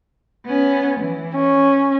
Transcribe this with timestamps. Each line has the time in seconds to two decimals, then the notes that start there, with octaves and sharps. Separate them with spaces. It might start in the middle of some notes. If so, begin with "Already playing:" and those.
0.45 B3 C#4
1.00 E3
1.35 C#4